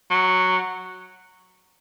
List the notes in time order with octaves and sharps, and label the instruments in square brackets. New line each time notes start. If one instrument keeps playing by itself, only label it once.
[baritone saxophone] F#3